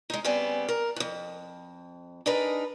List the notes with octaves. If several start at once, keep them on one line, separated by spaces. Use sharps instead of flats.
G#3 D#4
C#3 G3 B3 C4 D5 G#5
A#4
F2 G#2
D4 D#4 G#4 A#4 B4